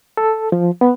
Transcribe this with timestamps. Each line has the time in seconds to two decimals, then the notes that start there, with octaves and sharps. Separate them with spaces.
0.17 A4
0.52 F3
0.81 B3